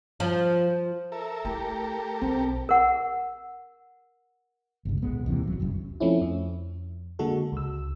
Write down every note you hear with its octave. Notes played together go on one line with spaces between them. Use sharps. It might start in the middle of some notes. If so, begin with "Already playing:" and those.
F3
A4 A#4 E5
A3 E4 G4 A4 A#4
B1 C4
A#4 F#5
G1 C#2
D1 B1 G#3 B3
D#2 C3 E3
D#1 F#3
F1 C2 F#2
F3 A3 C4 C#4 E4
F2
D3 G#3 A#3 F#4 A4
C#2 E6